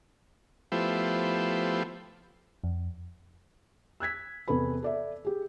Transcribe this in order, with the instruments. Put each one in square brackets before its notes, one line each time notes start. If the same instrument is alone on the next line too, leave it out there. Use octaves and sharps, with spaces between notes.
[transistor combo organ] F3 A3 B3 E4 G4 C5
[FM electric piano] F2
[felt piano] E6 F#6 G#6 B6
E2 C3 A4 B4 B5
A4 D5 E5
G4 G#4